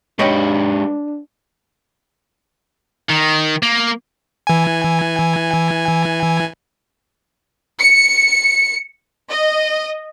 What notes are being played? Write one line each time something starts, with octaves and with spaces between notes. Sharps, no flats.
G#3 D4 G4 B4 C#5 D#5 G5
D#3
A#3
E3 G#5
C#7
D#5